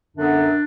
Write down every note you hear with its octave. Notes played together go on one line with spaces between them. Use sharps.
F#2 D3 F#3 B3 D4